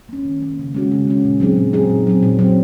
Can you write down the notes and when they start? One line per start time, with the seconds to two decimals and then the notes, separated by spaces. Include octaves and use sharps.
0.09 A#3 C#4
0.25 D#3
0.42 A#3 C#4
0.59 C#3
0.74 G#3 C#4 F#4
0.92 C#3
1.07 G#3 C#4 F#4
1.24 A#2
1.40 F#3 C4 D#4 G#4
1.57 A#2
1.73 F#3 C4 D#4 G#4
1.90 A#2
2.07 F#3 C4
2.23 A#2
2.39 F#3 C4